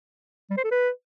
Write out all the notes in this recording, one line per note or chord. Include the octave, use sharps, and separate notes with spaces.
G3
C5
A4
B4